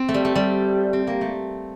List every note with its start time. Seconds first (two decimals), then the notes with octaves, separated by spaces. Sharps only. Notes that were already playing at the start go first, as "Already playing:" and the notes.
Already playing: C4
0.08 A3
0.14 G3
0.25 A3
0.35 G3
0.93 C4
1.07 A#3
1.21 A3